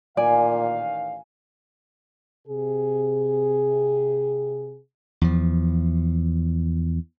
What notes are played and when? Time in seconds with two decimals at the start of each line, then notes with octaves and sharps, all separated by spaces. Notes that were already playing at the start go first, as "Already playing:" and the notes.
0.17 A1 A#2 D#3 D5 F5 G#5
2.48 C3 G#4
5.21 E2 F3